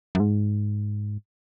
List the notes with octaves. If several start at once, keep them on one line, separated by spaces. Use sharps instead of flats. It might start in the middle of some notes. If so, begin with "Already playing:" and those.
F#2
G#2